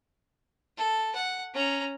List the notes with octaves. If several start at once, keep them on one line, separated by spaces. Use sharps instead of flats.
A4
F#5
C#4 A#5